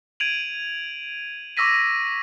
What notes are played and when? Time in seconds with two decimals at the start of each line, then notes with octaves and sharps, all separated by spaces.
0.20 G#6 D7 D#7 F7 F#7
1.57 C#6 D6 E6 A#6 B6 D#7